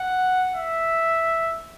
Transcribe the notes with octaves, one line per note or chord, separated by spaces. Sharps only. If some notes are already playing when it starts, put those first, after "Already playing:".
Already playing: F#5
E5